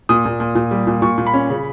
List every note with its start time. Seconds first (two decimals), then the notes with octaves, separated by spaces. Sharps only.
0.09 A#2 D#6
0.25 A#2
0.40 A#2
0.55 A#2
0.71 G3
0.87 A#2
1.02 A#2 C#6
1.18 A#2
1.27 B5
1.34 C#4
1.50 C#3